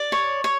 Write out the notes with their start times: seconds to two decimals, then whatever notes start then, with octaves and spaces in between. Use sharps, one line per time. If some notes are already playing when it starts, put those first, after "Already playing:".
Already playing: D5
0.12 C#5
0.44 C#5